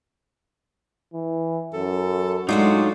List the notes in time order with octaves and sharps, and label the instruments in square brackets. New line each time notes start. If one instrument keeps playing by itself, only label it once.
[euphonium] E3
[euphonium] F#2 [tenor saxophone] A4
[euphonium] A2 [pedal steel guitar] F#3 D#4 F4 [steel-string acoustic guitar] G#3 A3 F#4 [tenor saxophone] D4